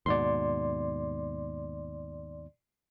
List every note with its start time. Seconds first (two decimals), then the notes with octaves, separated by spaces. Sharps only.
0.06 D#2 G#2 B2 D5 C6